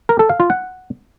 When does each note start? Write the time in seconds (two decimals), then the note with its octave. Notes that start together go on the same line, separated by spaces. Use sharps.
0.09 A#4
0.19 A4
0.29 F5
0.40 F4
0.50 F#5